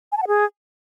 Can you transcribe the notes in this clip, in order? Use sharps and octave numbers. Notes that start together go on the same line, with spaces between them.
G#5
A5
F#5
G#4